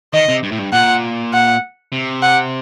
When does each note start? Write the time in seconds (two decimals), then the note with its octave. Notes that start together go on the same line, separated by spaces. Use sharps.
0.13 D#3 D#5
0.28 C3
0.43 G2
0.51 A2
0.59 G2
0.73 A#2 F#5
1.33 F#5
1.92 C3
2.22 F#5